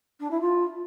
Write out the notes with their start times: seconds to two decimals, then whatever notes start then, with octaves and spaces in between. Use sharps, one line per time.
0.20 D4
0.31 E4
0.41 F4